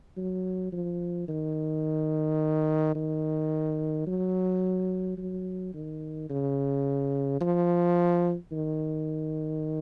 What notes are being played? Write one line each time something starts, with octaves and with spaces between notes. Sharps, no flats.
F#3
F3
D#3
D#3
F#3
F#3
D#3
C#3
F3
D#3